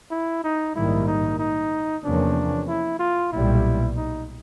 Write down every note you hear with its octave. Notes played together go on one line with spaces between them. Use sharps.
E4
D#4
A#1 G#2 D#3 G3 A#3 E4
D#4
D#4
E2 C3 F3 A#3 C#4 D4
E4
F4
B1 A#2 G3 E4
D#4